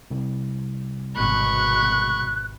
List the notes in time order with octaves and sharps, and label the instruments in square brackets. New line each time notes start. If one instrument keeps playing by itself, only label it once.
[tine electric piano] C2
[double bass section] G#1 B2 [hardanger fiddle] B5 C#6 [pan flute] F#6